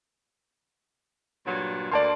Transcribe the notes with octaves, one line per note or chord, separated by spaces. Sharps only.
G2 A#2 F#3
D2 A#3 D5 A5 C6